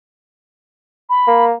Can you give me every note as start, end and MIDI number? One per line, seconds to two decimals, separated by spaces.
1.10 1.45 83
1.27 1.53 58